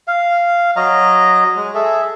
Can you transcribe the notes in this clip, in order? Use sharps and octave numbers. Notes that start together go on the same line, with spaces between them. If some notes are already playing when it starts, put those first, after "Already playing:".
F5
F#3 D#5 A#5
G#3
G#4 A4 E5